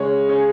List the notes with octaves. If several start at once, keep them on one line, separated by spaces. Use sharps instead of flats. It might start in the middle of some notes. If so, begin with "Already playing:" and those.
Already playing: C#3 G#3 C#5
C#4